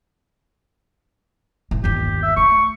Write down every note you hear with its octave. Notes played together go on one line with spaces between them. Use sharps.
A1 A3
G1 D#2 G4
E5
A3 C#6